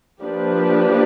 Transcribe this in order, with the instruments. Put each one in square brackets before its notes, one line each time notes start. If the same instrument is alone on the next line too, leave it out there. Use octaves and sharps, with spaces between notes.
[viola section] F3 A#3 D4 G4 B4